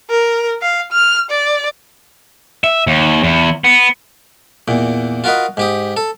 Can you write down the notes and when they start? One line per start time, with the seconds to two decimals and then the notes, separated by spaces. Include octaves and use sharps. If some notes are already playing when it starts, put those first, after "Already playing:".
0.10 A#4
0.62 F5
0.92 F6
1.30 D5
2.64 E5
2.87 D#2
3.23 E2
3.64 B3
4.68 E2 A#2
5.24 F4 F#4 A#4 B4 D#5
5.57 G#2 G4 D#6
5.97 A4